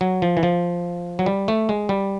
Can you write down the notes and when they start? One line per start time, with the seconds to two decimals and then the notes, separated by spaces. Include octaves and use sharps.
0.01 F#3
0.22 F3
0.37 E3
0.43 F3
1.19 F#3
1.26 G3
1.48 A3
1.69 G#3
1.89 G3